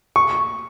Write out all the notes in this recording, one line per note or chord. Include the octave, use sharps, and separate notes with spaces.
C#6